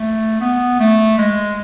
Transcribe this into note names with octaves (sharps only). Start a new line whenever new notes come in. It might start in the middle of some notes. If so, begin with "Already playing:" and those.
Already playing: A3
B3
A3
G#3